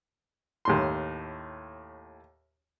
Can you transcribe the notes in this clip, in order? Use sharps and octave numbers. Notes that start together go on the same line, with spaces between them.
D#2 A2 C6